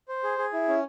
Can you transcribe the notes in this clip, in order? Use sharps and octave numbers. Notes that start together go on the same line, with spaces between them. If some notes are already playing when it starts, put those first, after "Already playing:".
C5
G#4
G#4
E4
C#4